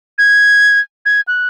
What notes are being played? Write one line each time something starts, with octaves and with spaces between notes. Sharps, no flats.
G#6
G#6
F#6